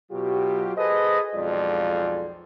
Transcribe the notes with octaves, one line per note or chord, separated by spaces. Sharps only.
B2 F#3 F4 G4
G#4 A4 B4 C5 D#5
B1 F2 G#3 F4 D5